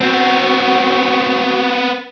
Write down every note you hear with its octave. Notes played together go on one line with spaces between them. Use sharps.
B3 C4 F#4